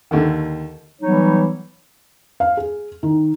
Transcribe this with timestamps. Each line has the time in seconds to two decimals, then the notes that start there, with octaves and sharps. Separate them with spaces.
0.11 D#2 D3 D#3
1.02 E3 F#3 G3 B3 D#4 C#5
2.40 F5
2.57 G#4
3.03 D#3